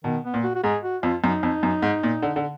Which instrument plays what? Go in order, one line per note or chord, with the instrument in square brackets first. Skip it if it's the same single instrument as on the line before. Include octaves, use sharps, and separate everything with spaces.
[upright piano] B2 [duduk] D#3
[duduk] B3
[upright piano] A#2
[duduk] F#4
F#4
[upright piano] G#2 [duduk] G#4
[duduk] F#4
[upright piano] F2 [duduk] F4
[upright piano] F#2 [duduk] D#4
[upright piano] F2
F#2
G#2
A#2
D3
D3